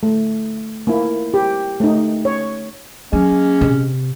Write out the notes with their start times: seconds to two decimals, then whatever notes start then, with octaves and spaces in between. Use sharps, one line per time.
0.03 A3
0.87 A#3 E4
1.34 G4
1.80 A3 D#4
2.25 C#5
3.13 F#3 G#3 A#3 C#4
3.61 C3